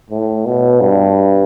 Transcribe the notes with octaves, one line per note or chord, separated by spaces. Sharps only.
A2
B2
G2